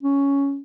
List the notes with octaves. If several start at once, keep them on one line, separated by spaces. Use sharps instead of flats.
C#4